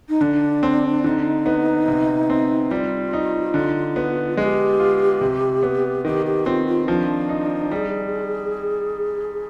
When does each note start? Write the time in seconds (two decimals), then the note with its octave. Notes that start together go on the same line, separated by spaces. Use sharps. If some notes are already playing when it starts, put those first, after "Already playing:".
0.09 D#4
0.21 D3 D4
0.63 C4
1.04 D3 D#4 F4
1.46 B3
1.88 C3
2.30 C4
2.71 G3 F4
3.13 D#4
3.54 D3
3.96 B3
4.37 G#3 G#4
4.42 G4
4.80 F4
5.21 C3
5.63 B3
6.05 D#3 G4
6.26 G4
6.46 C4 F4
6.67 F4
6.88 F3 D4
7.29 D#4
7.71 G3 G#4